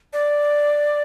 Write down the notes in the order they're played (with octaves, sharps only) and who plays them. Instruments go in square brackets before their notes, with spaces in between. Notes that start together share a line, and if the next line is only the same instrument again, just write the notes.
[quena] D5